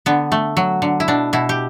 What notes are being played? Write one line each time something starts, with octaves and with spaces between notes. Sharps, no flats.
D3 B3
A3
F#3
D3
E4
B2 D4
B2 E4
G4